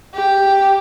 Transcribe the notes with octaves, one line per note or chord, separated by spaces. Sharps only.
G4